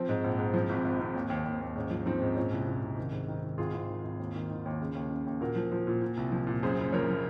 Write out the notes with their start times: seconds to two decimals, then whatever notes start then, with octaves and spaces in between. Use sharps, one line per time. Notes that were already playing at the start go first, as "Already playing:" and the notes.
Already playing: F3 C4
0.09 G#2
0.24 A#1
0.39 G#2
0.54 F3 C4
0.69 G#1
0.85 G#1
1.00 G#1
1.15 D#2
1.30 D#2
1.45 D#2
1.61 D#2
1.76 G#2 C#4
1.91 F3
2.06 F3 C4 D#4
2.22 G#2
2.36 A#2 C#4
2.52 C2
2.67 A#2
2.83 C2
2.98 D#3
3.12 G#2
3.28 D#3
3.43 D#3
3.58 G#1 F4 G#4
3.74 G#1
3.89 D#3
4.04 G#1
4.19 D#2
4.35 D#3
4.50 D#3
4.65 D#2
4.81 C#3
4.95 D#2
5.10 C#3
5.26 D#2
5.41 A#2 F#4 A#4
5.56 F3
5.72 F3
5.87 A#2
6.02 A#2
6.17 C2
6.32 F3
6.47 A#2
6.63 F#2 G#4 C5
6.78 F#1
6.92 F3 A#4 C#5
7.09 F3